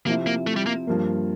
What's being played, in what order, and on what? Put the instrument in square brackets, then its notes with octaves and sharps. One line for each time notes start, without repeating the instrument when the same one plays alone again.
[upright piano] C3 F3 C4 E4 [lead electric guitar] A#3
[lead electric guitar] A#3
A3
G3
A#3
[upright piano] G2 F3 A#3